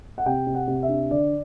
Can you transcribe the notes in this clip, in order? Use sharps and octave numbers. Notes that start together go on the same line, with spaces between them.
F#5
C3 G5
C3
F#5
C3
E5
D4
D3 D5